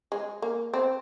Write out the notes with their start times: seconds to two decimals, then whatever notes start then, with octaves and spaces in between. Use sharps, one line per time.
0.12 G#3
0.42 A#3
0.74 C4